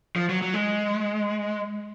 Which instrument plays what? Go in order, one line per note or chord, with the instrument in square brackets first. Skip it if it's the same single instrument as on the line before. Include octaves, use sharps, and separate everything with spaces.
[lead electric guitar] F3
F#3
F#3
G#3